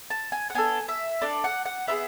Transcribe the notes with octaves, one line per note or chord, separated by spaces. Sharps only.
A5
G#5
F#5
B3 D4 A4 G#5
E5
D4 A4 D5
F#5
F#5
B3 E4 G#4 E5